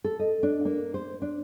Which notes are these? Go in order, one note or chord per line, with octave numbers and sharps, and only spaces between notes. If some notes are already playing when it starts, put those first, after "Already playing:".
A4
D#5
D4
A#3
C5
D4